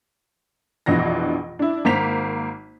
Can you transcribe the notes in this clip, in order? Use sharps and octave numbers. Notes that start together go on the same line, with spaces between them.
F1 A#1 B2 E3 D4 A#6
D4 E4
G#1 A#3 C5 A#5 B6 F7